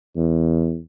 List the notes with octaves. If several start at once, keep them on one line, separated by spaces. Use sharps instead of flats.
E2